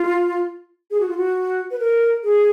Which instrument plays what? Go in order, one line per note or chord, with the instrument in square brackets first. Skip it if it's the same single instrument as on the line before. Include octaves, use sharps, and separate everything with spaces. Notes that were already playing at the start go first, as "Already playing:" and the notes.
Already playing: [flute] F4
G#4
F#4
F4
F#4
B4
A#4
G#4